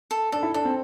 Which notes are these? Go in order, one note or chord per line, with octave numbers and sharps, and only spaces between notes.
A4
D4 A4
E4
D4 A4
C4